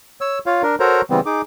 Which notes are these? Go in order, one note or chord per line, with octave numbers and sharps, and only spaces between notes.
C#5 E6
F4 C#5 F5
D4 A#4
F#4 A4 A#4 C5 C#5 A#5
C#3 E3 G3 B3 C4
D#4 G#4 D6